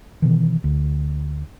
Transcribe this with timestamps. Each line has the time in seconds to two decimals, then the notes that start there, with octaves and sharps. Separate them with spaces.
0.22 B2 D#3 E3
0.64 D2